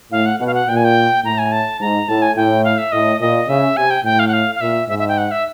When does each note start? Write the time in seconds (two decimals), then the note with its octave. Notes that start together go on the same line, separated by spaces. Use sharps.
0.12 A2 F5
0.26 F#5
0.40 B2 F#5
0.47 F5
0.54 F#5
0.68 A#2 G5
0.77 G#5
0.84 G5
1.24 A2 A#5
1.38 G#5
1.52 A5
1.80 G#2 A#5
2.09 A2 A5
2.22 G#5
2.36 A2 G5
2.64 F5
2.78 E5
2.92 A2 D#5
3.21 A#2 D#5
3.49 C#3 E5
3.77 C3 G#5
3.90 G5
4.04 A2 G5
4.19 F5
4.28 F#5
4.33 F5
4.55 F5
4.61 A#2 E5
4.88 G#2 E5
4.99 E5
5.08 G5
5.18 F#5
5.31 E5